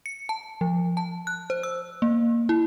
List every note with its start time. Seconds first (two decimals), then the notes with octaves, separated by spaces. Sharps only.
0.06 C#7
0.29 A5
0.61 F3
0.97 A5
1.27 F#6
1.50 C5
1.63 E6
2.02 A#3
2.49 E4